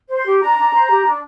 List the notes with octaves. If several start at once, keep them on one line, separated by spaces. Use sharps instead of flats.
C5
C6
G4
D4 A#5
D4
C5
G4
D4